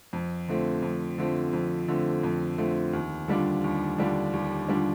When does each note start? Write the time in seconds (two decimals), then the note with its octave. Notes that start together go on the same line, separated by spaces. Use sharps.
0.13 F2
0.48 D3 F3 A3 C4
0.82 F2
1.18 D3 F3 A3 C4
1.53 F2
1.88 D3 F3 A3 C4
2.23 F2
2.58 D3 F3 A3 C4
2.93 D#2
3.28 D3 G3 D4 F4
3.64 D#2
3.98 D3 G3 D4 F4
4.33 D#2
4.68 D3 G3 D4 F4